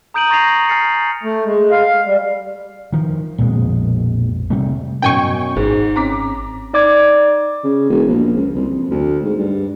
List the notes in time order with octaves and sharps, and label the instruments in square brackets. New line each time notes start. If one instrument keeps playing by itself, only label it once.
[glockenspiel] A#5 D#6 G6 D7 D#7 F#7
A#5 C#6 A6 A#6 C7 F7
G#5 F6 A6 C7 C#7
[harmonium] A3
G#3
F5
G3
[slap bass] D#3 F3
A#1 F2 B2 G#3
C3 G3 A3
[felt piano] F#2 B2 [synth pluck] G5 G#5 C#6
[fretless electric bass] G#1 [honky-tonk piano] G#2 [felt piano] G#4 C5
[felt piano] C4 C#4 [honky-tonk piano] A#5 D6 B6
[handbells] D#4 D5 D6 G#6
[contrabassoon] C#3
E1
A#1
C#2
C2
F2
D2
G#2
G2